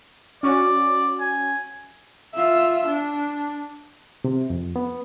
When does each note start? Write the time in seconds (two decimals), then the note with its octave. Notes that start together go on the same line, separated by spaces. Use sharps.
0.43 C#4 F#4 D5
1.20 G#5
2.34 F4 E5
2.86 D4
4.25 C3
4.50 F2
4.76 B3